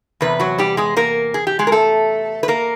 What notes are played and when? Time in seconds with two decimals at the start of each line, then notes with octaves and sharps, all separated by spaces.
0.21 E2 C3 B4
0.40 F#3 F#4
0.58 G3 G4
0.77 G#3 G#4
0.97 A#3 A#4
1.34 G#4
1.47 G4
1.59 G#3 G#4
1.67 A#4
1.72 A3 A4
2.43 B4
2.48 A#3 A#4